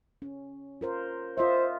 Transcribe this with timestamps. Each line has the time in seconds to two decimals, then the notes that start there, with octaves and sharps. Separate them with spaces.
0.22 C#4
0.81 F4 A#4 C5
1.38 F4 C5 D#5 E5